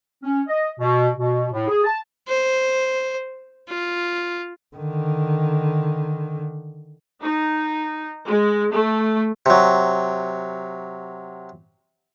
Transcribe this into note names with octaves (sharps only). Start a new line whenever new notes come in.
C#4
D#5
B2
B2
A2
G#4
A5
C5
F4
D3 D#3
D#4
G#3
A3
C3 F#3